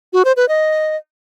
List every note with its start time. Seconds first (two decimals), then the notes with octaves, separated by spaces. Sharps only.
0.13 F#4
0.25 C5
0.37 B4
0.48 D#5